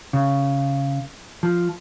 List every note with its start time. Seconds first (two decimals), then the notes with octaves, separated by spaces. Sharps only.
0.13 C#3
1.43 F3